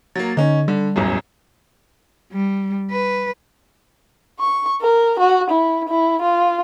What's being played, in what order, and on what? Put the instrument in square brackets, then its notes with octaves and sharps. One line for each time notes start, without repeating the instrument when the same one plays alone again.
[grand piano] F#3 A#3 [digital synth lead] A6
[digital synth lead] D3 [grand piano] C#4 D#4
[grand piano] D3 [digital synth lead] G3
[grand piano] E1 A1 F#2
[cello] G3
B4
[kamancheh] C#6
A#4
F#4
E4
E4
F4